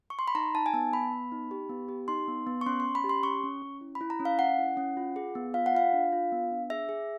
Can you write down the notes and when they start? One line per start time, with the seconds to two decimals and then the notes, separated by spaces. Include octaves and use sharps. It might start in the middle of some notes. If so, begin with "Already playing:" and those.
0.10 C#6
0.19 C6
0.28 B5
0.35 D#4 A#5
0.54 D#4 A5
0.66 G#5
0.73 B3 A5
0.93 B3 B5
1.12 B3
1.32 D#4
1.51 G4
1.69 B3
1.89 G4
2.08 D#4 C6
2.28 B3
2.47 B3
2.61 C#6
2.66 C#4 C6
2.80 C#4 C6
2.95 B5
3.04 G4
3.09 C6
3.23 C#4 C#6
3.44 C#4
3.62 C#4
3.81 E4
3.95 B5
4.01 E4
4.10 A#5
4.20 C#4
4.25 F5
4.39 C#4 F#5
4.58 E4
4.77 C#4
4.97 F4
5.16 G#4
5.35 B3
5.54 F4 F5
5.66 F#5
5.75 F4 F5
5.93 D4
6.12 F4
6.32 B3
6.51 D4
6.70 G#4 E5
6.89 G#4